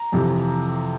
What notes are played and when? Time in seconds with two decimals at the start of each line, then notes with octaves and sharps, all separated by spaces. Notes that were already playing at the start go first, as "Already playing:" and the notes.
Already playing: A#5
0.12 F2 C3 E3